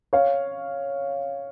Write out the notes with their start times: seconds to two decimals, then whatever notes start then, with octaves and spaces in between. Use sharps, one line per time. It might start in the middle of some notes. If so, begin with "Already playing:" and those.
0.13 C#5 F5